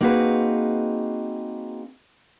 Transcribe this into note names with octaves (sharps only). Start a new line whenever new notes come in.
A#3 C4 D#4 F#4 G#4 B4